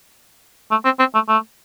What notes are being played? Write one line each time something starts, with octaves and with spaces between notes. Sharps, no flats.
A3
C4
C4
A3
A3